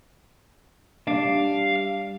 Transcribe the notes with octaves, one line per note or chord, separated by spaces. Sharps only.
G3 D4 F5